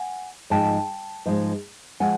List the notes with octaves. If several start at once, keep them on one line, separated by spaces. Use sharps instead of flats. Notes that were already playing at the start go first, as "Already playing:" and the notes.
Already playing: F#5 G#5
G#2 F3 G#3 G5 A5
G#2 F3 G#3
F3 G#3 F#5 G#5